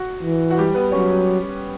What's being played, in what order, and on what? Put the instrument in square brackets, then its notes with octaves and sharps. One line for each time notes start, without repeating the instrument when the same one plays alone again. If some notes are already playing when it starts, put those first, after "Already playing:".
Already playing: [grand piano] F#4
[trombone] E3
[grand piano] F#4
G3 G4
B3 B4
[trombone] F#3 [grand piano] C#4 C#5